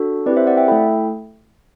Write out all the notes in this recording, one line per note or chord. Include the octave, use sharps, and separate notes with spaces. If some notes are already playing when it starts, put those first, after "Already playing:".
Already playing: D4 F#4 A4
C4 E4 G4 B4 D5
C5 E5
D5 F#5
E5 G5
A3 E4 A4 G5 B5